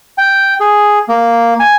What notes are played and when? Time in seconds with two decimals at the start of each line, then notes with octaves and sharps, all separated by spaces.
0.18 G5
0.60 G#4
1.09 A#3
1.60 G#5